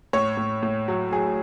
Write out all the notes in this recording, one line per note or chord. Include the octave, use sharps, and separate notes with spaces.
A2 C#5
A2
A2
F#3
F#3 G#4